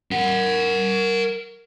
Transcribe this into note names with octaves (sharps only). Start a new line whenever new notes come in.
A#4 F#5